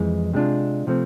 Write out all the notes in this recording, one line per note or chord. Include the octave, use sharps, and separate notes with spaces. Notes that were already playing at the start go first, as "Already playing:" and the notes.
Already playing: F2 E3 G#3
C3 G#3 D4 F4
C3 F3 A3 C4